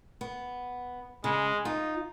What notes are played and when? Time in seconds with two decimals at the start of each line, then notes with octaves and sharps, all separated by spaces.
0.21 B3
1.24 C#3 G#3
1.65 D#4 F4